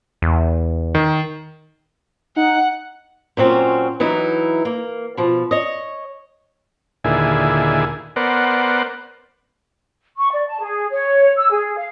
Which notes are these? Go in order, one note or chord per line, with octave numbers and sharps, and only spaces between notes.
E2
D#3
D#4 F#5
A#2 F#3 C4 C#4
E3 F#3 D#4 E4
A#3
B2 F3
C#5 D#5
D#2 A#2 D3 E4 G#4
B3 A#4 C5 D5 F#5
C#6
D5
A5
G#4
C#5
E6
G#4
F5